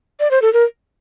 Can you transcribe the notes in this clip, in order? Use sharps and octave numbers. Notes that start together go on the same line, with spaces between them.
D5
C5
A4
A#4